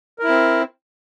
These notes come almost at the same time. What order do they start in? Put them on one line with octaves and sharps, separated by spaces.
A#4 E4 C4